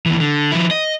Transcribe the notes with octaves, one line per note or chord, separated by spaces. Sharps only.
D#2 E3
D3
F3 E4
D#5